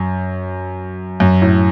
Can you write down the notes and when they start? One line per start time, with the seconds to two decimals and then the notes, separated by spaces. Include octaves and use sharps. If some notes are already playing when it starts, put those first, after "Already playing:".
Already playing: F#2
1.20 F#2
1.42 A2